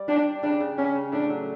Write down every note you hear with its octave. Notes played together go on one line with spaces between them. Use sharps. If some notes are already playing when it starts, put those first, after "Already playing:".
Already playing: G3 D5
D4 G4
D5
C#3 D4
C#3
C#3 C#4
C#3
A2 D4
F#3